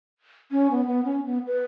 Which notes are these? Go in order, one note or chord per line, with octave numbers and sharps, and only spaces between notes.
C#4
B3
B3
C#4
B3
B4